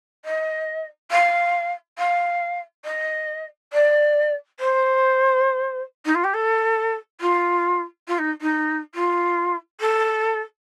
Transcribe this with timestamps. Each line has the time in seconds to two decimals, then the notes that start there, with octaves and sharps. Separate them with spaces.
0.25 D#5
1.11 F5
1.98 F5
2.85 D#5
3.73 D5
4.60 C5
6.05 D#4
6.15 F4
6.24 G4
6.34 A4
7.20 F4
8.08 F4
8.18 D#4
8.41 D#4
8.95 F4
9.80 A4